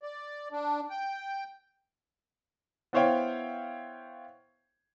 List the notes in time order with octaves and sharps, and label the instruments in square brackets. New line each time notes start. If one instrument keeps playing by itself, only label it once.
[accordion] D5
D4
G5
[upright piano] B3 E4 C5 C#5 F5 G5